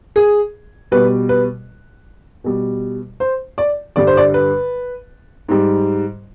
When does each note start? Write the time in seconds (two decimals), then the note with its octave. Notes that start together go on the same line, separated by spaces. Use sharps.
0.16 G#4
0.92 B2 G3 B4
1.29 B4
2.44 B2 G3
3.20 C5
3.58 D5
3.96 G2 D3 G3 D5
4.07 C5
4.17 D5
4.34 B4
5.48 G#2 G3